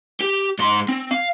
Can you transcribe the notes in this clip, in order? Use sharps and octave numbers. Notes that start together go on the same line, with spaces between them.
G4
G#2 C6
C4
F5